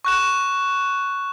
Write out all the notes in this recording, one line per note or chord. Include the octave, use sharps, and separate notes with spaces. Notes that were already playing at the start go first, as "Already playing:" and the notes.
C#6 F#6 E7